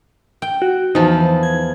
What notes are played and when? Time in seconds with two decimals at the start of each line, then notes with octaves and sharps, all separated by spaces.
0.42 G5
0.62 F#4
0.95 E2 F3 D#4
1.43 G#6